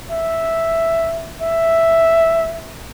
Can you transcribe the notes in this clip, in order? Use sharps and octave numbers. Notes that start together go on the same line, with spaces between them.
E5
E5